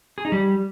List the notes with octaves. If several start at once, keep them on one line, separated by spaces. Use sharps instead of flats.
G#4
D#4
G3